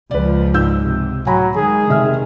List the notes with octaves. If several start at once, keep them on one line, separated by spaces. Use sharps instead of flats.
C#2 F3 B4 D5
G#2 E6 G6
C3
A2 F#3 G#5 A#5 B5
D#3 G#3 G#4
F1 D#3 E5 F6